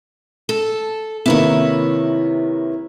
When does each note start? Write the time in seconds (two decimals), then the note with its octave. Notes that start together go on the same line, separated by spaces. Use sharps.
0.49 A4
1.26 C3 D#3 A#3 E4 B4 C#5